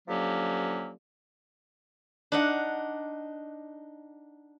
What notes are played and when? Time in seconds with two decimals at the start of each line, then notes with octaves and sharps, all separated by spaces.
0.08 D3 F3 F#3 A#3 C#4 G4
2.32 D4 D#4 F#5